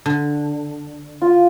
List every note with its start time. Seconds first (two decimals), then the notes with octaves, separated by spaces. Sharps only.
0.06 D3
1.22 F4